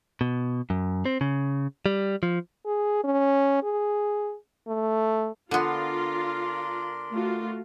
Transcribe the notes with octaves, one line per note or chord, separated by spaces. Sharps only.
B2
F#2
C4
C#3
G3
F3
G#4
C#4
G#4
A3
D3 B3 D4 F4 A#4 C6
A3 F4 F#4